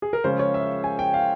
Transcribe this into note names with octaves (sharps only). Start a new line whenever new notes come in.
G#4
A#4
C#3 F3 G#3 C#4 F4 C5
C#5
E5
G#5
G5
F5